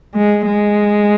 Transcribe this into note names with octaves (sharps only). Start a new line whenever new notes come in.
G#3
G#3